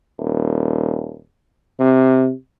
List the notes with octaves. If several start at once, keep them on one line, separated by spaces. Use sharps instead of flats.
D#1
C3